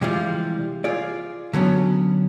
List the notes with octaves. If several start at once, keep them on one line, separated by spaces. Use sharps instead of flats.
C3 E3 F3 G3 G#3 F4
F4 G#4 D5
D3 F#3 B3 C#4